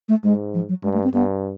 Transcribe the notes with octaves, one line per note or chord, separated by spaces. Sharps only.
A3
G#2 G#3
F3
F#3
G2 G#3
A3
C4
G2 B3